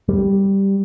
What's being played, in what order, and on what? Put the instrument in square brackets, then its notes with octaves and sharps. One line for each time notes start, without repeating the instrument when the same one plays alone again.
[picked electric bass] G3